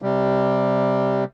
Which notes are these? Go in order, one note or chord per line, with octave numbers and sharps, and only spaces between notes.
C3 G3